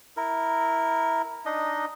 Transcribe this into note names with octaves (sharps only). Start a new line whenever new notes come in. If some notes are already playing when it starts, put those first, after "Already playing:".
E4 A#4
D4 D#4 D#5